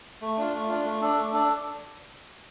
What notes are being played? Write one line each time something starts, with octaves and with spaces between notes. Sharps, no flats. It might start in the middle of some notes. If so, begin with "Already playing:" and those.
A3
D4 F4
A3
D4 F4
A3
D4 A4 D5
A3
D4 A4 D5